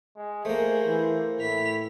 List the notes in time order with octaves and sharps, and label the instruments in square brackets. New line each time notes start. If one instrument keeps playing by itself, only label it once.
[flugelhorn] G#3
[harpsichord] A3 A#3 [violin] G#4 [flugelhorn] C5
[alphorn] E3
[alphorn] A2 [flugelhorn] E4 [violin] B6 F7